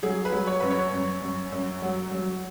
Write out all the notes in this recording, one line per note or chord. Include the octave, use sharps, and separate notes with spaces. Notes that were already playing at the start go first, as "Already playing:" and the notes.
F#3 G#4
B4
F#3
C#5
F#2 B4
C#5
F#2
F#2
F#2
F#3
F#3